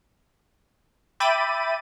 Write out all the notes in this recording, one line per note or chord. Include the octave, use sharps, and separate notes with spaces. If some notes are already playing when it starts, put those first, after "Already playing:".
E5 G5 B5 D6 A6 D#7